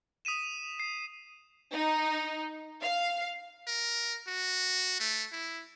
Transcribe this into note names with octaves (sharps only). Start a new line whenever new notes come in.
D#6 B6 D#7 E7
C7
D#4
F5
A#4
F#4
A3
E4